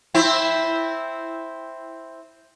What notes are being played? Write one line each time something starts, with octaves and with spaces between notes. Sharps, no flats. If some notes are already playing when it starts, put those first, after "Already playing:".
C4 E4